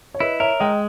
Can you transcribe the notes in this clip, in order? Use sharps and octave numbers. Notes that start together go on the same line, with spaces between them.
C#5
E4 B4 D#5
A#4 C#5 E5
G#3 D#5 G5